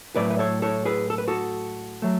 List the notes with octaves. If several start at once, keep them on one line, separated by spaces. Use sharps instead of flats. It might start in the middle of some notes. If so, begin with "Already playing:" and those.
A2 F#3 A3 B4 D5
B4
A4 C#5
A4 C#5
G#4 B4
A4
B4
F#4 A4
F#3 A3